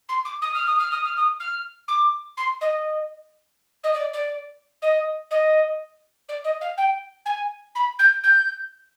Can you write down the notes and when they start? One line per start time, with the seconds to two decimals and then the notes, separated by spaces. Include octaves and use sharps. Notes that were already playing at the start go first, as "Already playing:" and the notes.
0.09 C6
0.25 D6
0.42 D#6
0.54 F6
0.66 D#6
0.79 F6
0.91 D#6
1.04 F6
1.16 D#6
1.40 F6
1.88 D6
2.37 C6
2.61 D#5
3.83 D#5
3.93 D5
4.13 D5
4.82 D#5
5.31 D#5
6.28 D5
6.44 D#5
6.61 F5
6.77 G5
7.25 G#5
7.75 B5
7.99 G6
8.23 G6